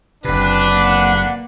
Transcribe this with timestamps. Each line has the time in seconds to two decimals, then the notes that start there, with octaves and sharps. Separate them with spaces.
0.24 F#1 C3 D4 B4
0.71 A#3 F#5